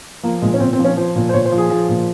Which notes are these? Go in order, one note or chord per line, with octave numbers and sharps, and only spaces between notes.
F3 A#3
A#2 G#3
C#4
A#2 C4
C4
F3
C#4
F3 C5
A#2
C5
A#2 C#5
C5
F3
G#4
F3
A#2